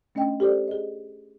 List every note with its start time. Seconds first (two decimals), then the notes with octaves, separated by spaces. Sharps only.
0.15 A3 C#4 D4 D#5 G5
0.40 G4 A4 C5 D5
0.68 G#4 D#5